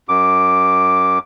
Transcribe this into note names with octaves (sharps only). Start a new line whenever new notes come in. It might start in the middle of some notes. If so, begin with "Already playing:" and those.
F#2 D6